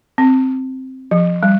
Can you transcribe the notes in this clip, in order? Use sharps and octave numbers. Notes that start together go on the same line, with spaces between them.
C4
F3
G3